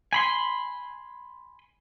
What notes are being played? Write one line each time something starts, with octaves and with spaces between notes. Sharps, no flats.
G#5 B5 C6